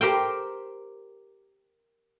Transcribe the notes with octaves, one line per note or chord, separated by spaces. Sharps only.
G4 A#4 C5 G5